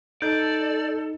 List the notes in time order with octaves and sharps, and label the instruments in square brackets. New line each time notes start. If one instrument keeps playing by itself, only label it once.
[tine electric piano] D#4 [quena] A4 [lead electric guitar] D5 [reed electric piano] G6